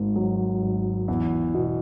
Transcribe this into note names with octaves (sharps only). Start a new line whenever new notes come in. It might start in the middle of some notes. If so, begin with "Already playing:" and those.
Already playing: G#1 G#2
F#3
G#1
E2
B2